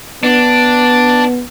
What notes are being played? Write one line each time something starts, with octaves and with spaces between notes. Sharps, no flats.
B3 D4